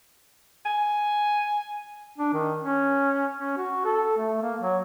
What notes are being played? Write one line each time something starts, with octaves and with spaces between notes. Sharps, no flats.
G#5
D4
D#3
C#4
C#4
F#4
A4
A3
A#3
F#3